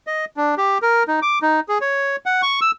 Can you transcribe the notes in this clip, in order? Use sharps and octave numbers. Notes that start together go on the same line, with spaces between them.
D#5
D4
G4
A#4
D#4
D6
D#4
G#4
C#5
F#5
C#6
E6